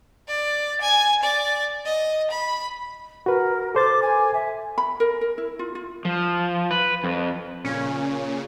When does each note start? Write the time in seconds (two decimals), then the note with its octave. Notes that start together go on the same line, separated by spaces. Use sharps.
0.28 D5
0.81 G#5
1.23 D5
1.85 D#5
2.31 B5
3.26 F#4 A#4 B4
3.75 A4 C5 D6 A6
4.02 G#5
4.34 E5
4.78 B5
5.00 A#4
5.21 A#4
5.38 E4
5.59 F4
5.75 F4
6.05 F3
6.71 B4
7.04 F2
7.65 A#2 C#3 C#4